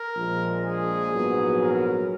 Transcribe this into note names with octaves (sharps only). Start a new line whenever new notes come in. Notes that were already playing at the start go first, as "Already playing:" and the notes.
Already playing: A#4
A#1 A#2 F3 G#3
G#4
A#1 G#2 F#3 B3
A#4